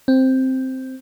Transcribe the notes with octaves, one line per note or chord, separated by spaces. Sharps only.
C4